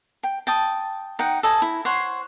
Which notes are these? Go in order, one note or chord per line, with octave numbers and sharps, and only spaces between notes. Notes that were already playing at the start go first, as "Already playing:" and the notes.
G5
G5 A5 D#6
D#4 F#5 G5
A4 D#5 G#5
E4
C5 C#5 F#5 C6